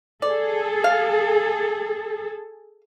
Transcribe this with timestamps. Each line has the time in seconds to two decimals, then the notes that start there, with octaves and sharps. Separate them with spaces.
0.22 G#4 A4 D5
0.84 F5